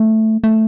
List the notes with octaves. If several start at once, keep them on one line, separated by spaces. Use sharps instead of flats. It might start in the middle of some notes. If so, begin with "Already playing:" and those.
Already playing: A3
A3